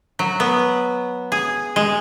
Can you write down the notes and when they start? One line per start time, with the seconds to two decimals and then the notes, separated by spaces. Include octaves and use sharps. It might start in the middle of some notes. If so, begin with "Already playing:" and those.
0.19 F#3
0.40 B3
1.32 G#4
1.76 G#3